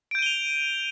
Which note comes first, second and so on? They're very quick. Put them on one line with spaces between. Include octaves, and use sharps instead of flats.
D7 G6 D#7 G7 F7